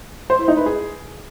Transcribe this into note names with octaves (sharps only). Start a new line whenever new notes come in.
C5
E4
D#4
B4
G#4